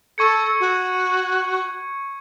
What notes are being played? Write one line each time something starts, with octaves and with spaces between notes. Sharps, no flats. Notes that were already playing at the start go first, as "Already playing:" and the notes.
A4 C#6 G#6 C#7
F#4